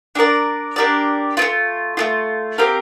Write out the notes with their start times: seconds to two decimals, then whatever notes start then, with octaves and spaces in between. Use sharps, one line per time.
0.15 D4 G4 A#4 D5
0.76 D4 G4 A#4 D5
1.37 C4 F4
1.42 A3
1.97 A3 C4 F4
2.58 C4 G4 A#4 F5